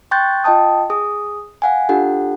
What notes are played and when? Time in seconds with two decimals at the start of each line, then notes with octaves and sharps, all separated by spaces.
0.11 G5 C6 C#6 F#6 G6 A6
0.44 F4 D#5 G5 A5 D#6
0.90 G#4 D#6
1.62 F5 F#5 G#5
1.89 D4 F4 G4 A4 F#5